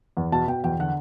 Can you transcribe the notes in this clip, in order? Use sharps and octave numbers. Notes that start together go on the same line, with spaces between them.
E2
B2 A5
B2 G5
E2 G5
D3 F#5